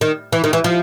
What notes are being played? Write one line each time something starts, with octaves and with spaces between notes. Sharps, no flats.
D#3
E3
D#3
E3
F3